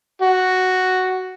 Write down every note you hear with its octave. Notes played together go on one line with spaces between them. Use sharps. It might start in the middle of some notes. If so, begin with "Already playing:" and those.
F#4